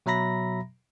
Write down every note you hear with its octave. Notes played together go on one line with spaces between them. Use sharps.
B2 F#3 E5 A#5 B5 A#6